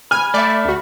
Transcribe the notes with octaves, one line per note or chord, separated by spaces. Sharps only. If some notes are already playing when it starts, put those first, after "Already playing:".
G#5 B5 F6
A3 D5 E5
D2 F#4